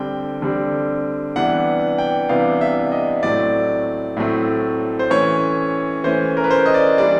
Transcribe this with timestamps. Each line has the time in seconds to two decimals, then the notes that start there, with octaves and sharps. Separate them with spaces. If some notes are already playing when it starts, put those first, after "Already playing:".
Already playing: D3 G3 C4 G5
0.42 D3 G3 C4
1.36 C3 E3 G3 B3 D4 F#5
1.98 G5
2.29 C3 E3 G3 B3 D4 F5
2.61 E5
2.92 D#5
3.23 A2 F#3 A3 C4 D5
4.17 A2 F#3 A3 C4
4.99 C5
5.10 E3 A3 C#4 C#5
6.04 E3 A3 C#4 C5
6.37 A#4
6.44 B4
6.51 C5
6.66 D#5
6.74 D5
6.98 E3 G3 A#3 D4 D5